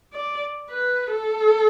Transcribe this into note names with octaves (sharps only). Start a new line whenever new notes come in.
D5
B4
A4